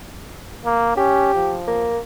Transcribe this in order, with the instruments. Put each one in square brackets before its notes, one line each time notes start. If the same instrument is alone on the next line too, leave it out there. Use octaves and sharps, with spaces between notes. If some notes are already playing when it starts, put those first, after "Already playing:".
[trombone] A#3
[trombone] C#4 [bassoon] G4
[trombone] F3
[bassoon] A#3